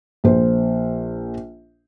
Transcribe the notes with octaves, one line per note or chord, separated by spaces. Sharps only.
A#1 C5